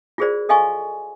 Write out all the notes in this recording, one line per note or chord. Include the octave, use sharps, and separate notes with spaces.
F4 F#4 G#4 A#4 C5 D5
A4 D#5 F5 G#5 C6 C#6